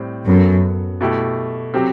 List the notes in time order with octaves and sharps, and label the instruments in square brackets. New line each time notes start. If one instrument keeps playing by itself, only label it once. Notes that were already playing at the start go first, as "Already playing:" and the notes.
Already playing: [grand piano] A2 G3 C4
[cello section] F#2 [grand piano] F#3 B3 F#4 A4
[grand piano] B2 A3 E4 G4
C3 F#3 C4 G4